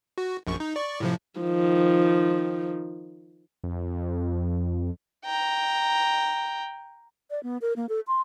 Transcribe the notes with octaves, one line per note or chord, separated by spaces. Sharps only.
F#4
A#1 F#2 C#6
D#4
D5 C#6
A2 C3 F3
D#3 F3
F2
G5 A#5
D5
B3
A#4
A#3
A4
C6